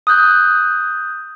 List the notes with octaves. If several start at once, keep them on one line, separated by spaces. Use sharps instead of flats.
D#6 F#6 G6